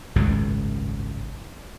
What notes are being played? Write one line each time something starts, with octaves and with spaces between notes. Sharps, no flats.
G#1 C#2 F#2 A2